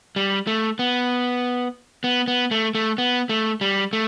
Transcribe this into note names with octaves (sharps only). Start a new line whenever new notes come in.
G3
A3
B3
B3
B3
A3
A3
B3
A3
G3
A3